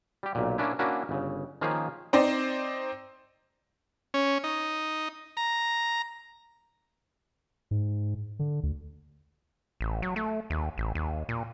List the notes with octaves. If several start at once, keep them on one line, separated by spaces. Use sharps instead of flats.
G3 G4
B1 A#2
A#3 C#4 D4 E4
A#3 C#4 D4 E4 F#4
G1 C#3
D#3 F3 A#3 C#4 G#4 F5
C4 D#4 C5 D5
C#4
D#4
A#5
G#2
D3
D2
A1
F#3
A3
D#2
A1
D#2
A#2